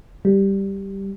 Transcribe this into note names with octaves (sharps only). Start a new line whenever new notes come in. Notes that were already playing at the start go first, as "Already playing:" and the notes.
G3